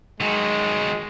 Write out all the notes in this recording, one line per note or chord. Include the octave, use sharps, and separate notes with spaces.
D#3 F#3 G#3